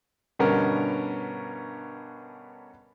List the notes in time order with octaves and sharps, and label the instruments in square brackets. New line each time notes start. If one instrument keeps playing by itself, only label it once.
[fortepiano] G2 B2 D3 B3 C#4 A#4